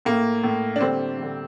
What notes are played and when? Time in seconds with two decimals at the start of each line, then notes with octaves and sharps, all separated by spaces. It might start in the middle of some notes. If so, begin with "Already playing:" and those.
0.05 A2 A3 A#3
0.43 A2 A3
0.76 D4
0.81 D3 G3 C4
1.18 D3 G3